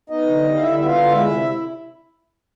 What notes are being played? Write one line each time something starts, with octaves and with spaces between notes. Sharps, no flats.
B3 D#4 D#5
D3
G3
F5
D3 E4 E5
B3 E5
F4 F5
D3
G#3 E4 E5
C3